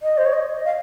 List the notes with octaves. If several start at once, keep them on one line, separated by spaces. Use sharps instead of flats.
D#5
C5
C#5
D#5
F5